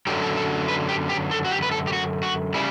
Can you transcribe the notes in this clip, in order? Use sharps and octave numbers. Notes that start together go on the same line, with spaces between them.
F#2 D3 F#3 G4
A4
A4
B4
G4
G4
A4
F#4
G4
B4
A4
G4
F#4
F#4
C#3 G3 E4